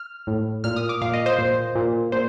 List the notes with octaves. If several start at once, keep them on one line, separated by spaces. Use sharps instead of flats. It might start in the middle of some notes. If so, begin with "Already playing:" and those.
Already playing: F6
A2
A#2 F6
D#6
D6
A#2 F5
D#5
C5
A#2
A#2
A#2 C5